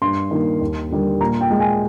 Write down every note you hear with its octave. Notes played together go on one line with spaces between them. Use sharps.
G2 C6
D#3 A#3
D#2
D3 G3 A#3
A#2 A#5
G5
G#3
G#5